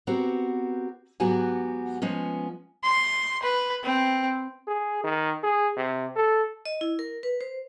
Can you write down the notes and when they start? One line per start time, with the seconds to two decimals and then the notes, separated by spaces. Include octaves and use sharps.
0.07 B3 C4 F#4 G4 A#4
1.20 G#2 F#3 B3 F#4 G4 G#5
2.02 F3 G#3 B3 C#4
2.84 C6
3.43 B4
3.84 C4
4.67 G#4
5.04 D#3
5.43 G#4
5.76 C3
6.16 A4
6.66 D#5
6.81 E4
6.99 A#4
7.23 B4
7.41 C5